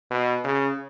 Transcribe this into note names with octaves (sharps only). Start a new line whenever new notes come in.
B2
C#3